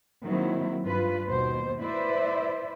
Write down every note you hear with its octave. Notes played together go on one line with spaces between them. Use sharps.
D#3 F#3 A#3 C4 E4
G2 F4 B4
D#2 B2 C5
E4 B4 C5 D5 E5